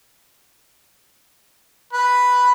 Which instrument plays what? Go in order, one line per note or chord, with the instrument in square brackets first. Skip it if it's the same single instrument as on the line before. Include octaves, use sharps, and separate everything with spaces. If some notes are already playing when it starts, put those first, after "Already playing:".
[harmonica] B4